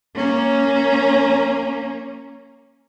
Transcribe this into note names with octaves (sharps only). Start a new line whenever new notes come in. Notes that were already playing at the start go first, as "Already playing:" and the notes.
A#3 C#4